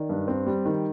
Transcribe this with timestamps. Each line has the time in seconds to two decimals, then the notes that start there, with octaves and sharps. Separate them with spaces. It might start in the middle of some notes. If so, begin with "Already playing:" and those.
Already playing: D#3 D5
0.09 G2
0.28 C4
0.47 G3
0.65 D#3